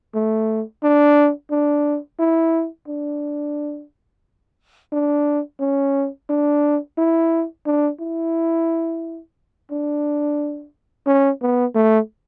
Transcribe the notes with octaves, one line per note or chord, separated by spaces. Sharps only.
A3
D4
D4
E4
D4
D4
C#4
D4
E4
D4
E4
D4
C#4
B3
A3